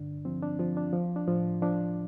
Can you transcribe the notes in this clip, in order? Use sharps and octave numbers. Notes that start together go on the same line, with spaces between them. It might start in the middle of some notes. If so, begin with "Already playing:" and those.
Already playing: G2 D3 D4
F3 C4
D4
F3 F4
D4
F3
D4
A2 F3 F4
F3 D4